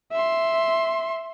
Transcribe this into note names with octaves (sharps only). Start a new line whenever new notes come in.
E5 C6